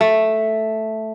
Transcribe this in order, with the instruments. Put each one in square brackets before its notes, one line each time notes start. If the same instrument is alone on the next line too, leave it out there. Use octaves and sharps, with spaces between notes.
[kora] A3